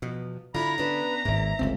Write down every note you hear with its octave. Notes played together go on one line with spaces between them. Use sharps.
E2 B2 F3
D3 E4 F4 A#5 B5
B3 C#4 D4 B4
G#1 G#2 A#3 E5
G1 C#2 E3 C4 A4